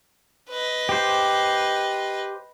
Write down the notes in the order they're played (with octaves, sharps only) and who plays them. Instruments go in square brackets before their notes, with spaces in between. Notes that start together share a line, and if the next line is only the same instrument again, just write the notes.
[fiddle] B4 D#5
[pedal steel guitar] G4 C5